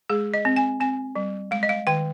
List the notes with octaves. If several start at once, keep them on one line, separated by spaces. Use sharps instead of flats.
G#3 G#4
D#5
C4
G#5
C4 G#5
G3
G#3 F5
D#5
F5
D#3 G5